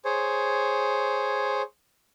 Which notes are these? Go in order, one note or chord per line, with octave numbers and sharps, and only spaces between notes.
G#4 C5 C#5